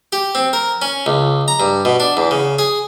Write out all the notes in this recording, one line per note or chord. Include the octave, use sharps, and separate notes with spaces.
G4
C4
A#4
C#4
C#2
A#5
G2
B2
D4
E2
C#3
G#4